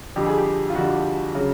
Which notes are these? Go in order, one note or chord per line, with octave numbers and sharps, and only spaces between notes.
F2 D3 G3 G4
G#4
G4
F4
F2 D3 G3 F#4
C#3 F#3